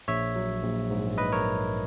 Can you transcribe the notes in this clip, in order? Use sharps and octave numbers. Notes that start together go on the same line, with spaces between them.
A#1 C#5 E5
F#3
A#1
G#2
A#1 B4 D#5
A#4 C#5